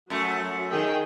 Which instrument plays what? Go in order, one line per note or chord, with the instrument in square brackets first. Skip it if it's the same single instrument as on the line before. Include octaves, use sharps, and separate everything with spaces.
[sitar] F#2 A3 [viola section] F#3
[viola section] D#3 G#4 G5